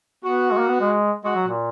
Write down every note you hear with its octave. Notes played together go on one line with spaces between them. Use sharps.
B3 F#4
G#3
A#3
B3
G#3
G#3 F#4
F#3
A#2